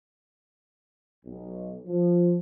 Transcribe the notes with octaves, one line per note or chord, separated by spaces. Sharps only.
B1
F3